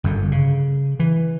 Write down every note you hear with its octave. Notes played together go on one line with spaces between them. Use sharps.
G1 F#2 D3
C#3
E3